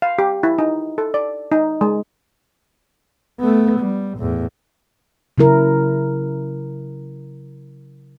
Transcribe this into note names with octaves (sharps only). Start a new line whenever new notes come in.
F5
G4
E4
D#4
A4
D5
D#4
G#3
A3 B3
G3
E2 A2
C#3 F#3 E4 A#4